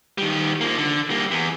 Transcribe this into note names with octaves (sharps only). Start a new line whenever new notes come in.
D#3 G3
F3 A#3
D3
G3 A#3
E2